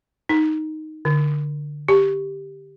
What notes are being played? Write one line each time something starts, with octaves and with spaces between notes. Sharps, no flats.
D#4
D3
G4